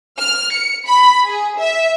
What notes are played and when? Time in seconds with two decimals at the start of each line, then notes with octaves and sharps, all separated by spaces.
0.16 F6
0.52 C#7
0.84 B5
1.26 G#4
1.58 E5